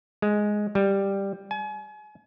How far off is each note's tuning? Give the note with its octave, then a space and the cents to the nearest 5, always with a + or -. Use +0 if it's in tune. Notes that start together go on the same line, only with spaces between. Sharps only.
G#3 +5
G3 +5
G#5 +35